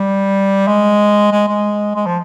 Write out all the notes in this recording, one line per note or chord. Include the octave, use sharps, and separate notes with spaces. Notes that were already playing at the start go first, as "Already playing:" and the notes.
Already playing: G3
G#3
G#3
G#3
G#3
F3